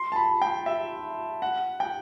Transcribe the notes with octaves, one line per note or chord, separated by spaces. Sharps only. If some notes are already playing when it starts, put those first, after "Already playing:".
Already playing: C6
A5
B5
G5
E5
F#5
G5